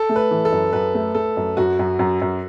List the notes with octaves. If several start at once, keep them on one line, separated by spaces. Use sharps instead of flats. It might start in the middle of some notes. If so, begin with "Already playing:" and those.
Already playing: A4
A3
B4
E3
A4
F#2
F#2 B4
A3
A3 A4
F#2
F#2 F#4
F#2
F#2
F#2